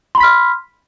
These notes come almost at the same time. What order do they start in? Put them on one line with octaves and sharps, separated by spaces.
C6 B5 B6 F6